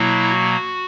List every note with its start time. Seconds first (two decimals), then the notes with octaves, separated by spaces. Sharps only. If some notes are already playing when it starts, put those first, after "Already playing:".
Already playing: B2 F#3 A#3 E4
0.30 F#4